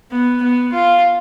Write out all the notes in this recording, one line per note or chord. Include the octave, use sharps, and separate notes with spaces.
B3
B3
F4